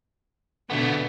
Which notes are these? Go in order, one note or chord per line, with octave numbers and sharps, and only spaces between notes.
B2 D3 A3 B3